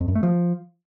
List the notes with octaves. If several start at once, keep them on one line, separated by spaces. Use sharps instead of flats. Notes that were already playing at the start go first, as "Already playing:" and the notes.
F2
F#2
A3
F3